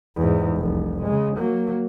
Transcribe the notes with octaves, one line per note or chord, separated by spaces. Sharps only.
E2 G#2
F1 C2
C#3 G#3
F#3 A#3